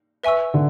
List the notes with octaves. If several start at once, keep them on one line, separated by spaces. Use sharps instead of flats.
B4 E5 G#5 C#6 E6
D3